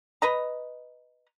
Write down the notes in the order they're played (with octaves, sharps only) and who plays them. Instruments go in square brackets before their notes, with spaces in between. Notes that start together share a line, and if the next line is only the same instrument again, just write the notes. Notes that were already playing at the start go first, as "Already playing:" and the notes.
[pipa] B4 D#5 A#5